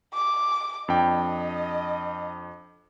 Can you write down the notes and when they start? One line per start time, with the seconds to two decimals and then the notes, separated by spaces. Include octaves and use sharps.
0.14 D6
0.88 F2 D4 D#5 G5